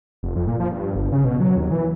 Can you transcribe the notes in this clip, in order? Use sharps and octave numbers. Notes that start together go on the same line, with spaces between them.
F1
F2
A#2
F3
G2
G1
C#3
B2
F#3
D#2
E3